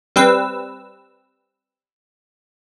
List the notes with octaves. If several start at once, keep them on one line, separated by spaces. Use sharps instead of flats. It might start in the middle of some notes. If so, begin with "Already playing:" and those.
G3 C4 B4 E6